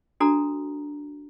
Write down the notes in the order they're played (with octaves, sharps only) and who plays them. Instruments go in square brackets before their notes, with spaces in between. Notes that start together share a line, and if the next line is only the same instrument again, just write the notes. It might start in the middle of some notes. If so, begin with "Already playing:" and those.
[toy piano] D4 F#4 A4 A#5